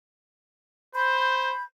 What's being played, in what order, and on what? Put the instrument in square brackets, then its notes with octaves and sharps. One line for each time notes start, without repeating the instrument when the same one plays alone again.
[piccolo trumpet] C5 [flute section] B5 G6